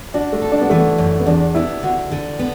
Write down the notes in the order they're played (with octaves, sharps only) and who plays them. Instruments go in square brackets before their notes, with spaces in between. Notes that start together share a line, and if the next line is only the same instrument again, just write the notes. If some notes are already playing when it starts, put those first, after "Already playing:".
[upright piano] D4 [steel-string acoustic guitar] F#4
[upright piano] A3
[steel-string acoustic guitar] A4
[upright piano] D4
B3
[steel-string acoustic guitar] E3 [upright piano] A3
[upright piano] B3
[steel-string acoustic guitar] F#2
[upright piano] B3
[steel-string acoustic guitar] E2 [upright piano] D4
[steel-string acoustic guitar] B3 [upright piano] E4
[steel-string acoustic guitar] D3 [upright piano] F#4
[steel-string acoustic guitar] D3
B3